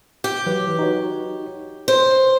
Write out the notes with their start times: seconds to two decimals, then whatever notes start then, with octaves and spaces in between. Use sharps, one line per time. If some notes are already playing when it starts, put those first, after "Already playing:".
0.24 G4
0.46 E3 F#3 B4
0.79 D#4 F#4 C#5
1.88 C5 C#5